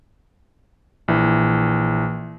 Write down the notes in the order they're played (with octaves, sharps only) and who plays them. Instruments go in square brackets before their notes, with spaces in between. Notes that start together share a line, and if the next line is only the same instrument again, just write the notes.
[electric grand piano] A#1 E3